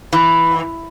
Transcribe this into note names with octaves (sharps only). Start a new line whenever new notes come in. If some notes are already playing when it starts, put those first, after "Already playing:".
E3